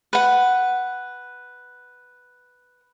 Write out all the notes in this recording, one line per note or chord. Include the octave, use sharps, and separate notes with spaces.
B4 F#5